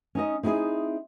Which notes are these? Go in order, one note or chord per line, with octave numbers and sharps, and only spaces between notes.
C#4 D#4 D#5
C4 D#4 E4 G4 G#4